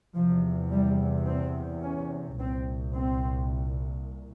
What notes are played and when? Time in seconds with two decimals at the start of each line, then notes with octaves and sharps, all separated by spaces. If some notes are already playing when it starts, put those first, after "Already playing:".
0.15 E2 C3 F3
0.71 G3
1.27 C4
1.82 C#4
2.39 C2 A#2 C4
2.95 C4